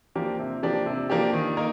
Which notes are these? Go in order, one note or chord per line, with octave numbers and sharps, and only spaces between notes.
F3 A#3 D4 G4
C3
F3 A#3 D4 G4
C3
F3 A#3 D4 G4
D#3
A#3 D#4 A#4